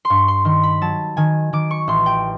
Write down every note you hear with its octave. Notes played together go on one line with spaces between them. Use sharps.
C6
G2 C#6
C6
D#3 C6
B5
F#3 A5
D#3 G#5
D#3 D6
C#6
A1 C6
G5